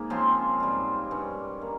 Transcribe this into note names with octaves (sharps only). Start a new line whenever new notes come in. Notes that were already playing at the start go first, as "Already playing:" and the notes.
Already playing: G#2 A#3
C#3 F3 C4 F4
G#2 G3 C4
G2 G3 C#4
D#3 A#3